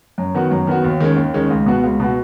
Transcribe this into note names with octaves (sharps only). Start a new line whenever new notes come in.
F#2
D#3 B3 F#4
F#2
D#3 B3 F#4
D#2
D#3 G#3 C#4
D#2
D#3 G#3 C#4
C#2
B2 B3 F#4
C#2
B2 B3 F#4